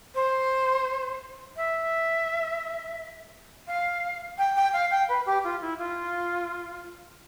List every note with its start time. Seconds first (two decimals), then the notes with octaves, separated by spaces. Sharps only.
0.15 C5
1.56 E5
3.67 F5
4.38 G5
4.56 G5
4.73 F5
4.91 G5
5.09 B4
5.26 G4
5.44 F4
5.61 E4
5.79 F4